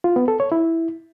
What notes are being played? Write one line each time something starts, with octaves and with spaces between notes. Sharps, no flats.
F4
B3
A4
C#5
E4